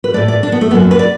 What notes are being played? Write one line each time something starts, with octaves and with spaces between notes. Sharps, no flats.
B4
A2 A3 D5
D5
D4
B3
A3
F#2 F#3 A3 B3
B4
D5